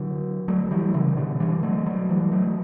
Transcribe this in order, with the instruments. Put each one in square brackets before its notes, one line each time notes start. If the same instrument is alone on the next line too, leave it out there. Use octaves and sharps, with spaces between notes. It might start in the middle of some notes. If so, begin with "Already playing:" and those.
Already playing: [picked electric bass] D3 F#3
F#3 A3
E3 G3
C#3 E3
B2 D3
E3 G3
F#3 A3
F#3 A3
E3 G3
F#3 A3